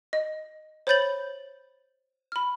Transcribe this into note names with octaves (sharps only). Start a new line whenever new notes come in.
D#5
C5 C#5 B5 G6 A6 F#7
B5 F6